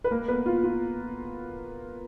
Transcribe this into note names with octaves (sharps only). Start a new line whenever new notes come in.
B4
A#3 A#4
B3 B4
F4
F4